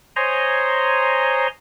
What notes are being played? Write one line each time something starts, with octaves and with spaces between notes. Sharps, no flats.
C5 C#5 D#5 G#5 A#5 C6